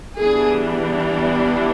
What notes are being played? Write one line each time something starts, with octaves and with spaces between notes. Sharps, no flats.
E3 G3 B3 D4 G#4